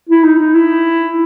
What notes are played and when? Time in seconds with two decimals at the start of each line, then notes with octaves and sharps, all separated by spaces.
0.09 E4
0.24 D#4
0.39 D#4
0.55 E4